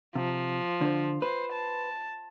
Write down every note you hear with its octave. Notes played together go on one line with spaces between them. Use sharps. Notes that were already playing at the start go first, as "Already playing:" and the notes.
C3 F3
D3 C5
B4 C5
A5